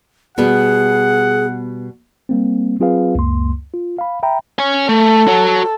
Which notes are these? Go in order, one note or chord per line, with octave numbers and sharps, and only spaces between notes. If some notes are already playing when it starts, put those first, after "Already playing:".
B2 G3 B3 G#4 F#5
G3 A#3 C4
F#3 C4 F4 G#4 B4 F5
C#2 F#2 A#3 C6
F4
F5 B5
E5 G5 A#5 B5
C#5 G#5
A3 A4
F#4 C#5